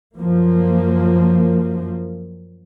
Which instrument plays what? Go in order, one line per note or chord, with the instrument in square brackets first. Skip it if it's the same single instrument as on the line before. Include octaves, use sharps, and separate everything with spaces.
[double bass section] F#2 F3 A#3